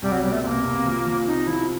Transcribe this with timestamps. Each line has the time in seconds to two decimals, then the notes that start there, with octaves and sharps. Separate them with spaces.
0.02 C2 G3
0.12 F#3
0.22 B2 G3
0.32 A3
0.43 C2 A#3 C4
0.64 C2
0.85 F3
1.06 F3
1.26 C3 D#4
1.47 F3 E4